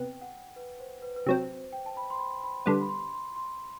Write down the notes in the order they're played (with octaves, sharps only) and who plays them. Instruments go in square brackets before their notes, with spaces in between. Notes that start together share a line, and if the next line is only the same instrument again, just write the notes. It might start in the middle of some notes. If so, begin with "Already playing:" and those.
Already playing: [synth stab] C3 B3 [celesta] G5
[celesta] F#5
B4
C5
B4
B4
[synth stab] C3 F#3 C4 [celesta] C5
[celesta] G5
A5
B5
C6
B5
B5
[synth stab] D3 G3 B3 [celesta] C6
[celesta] B5
C6
C6
C6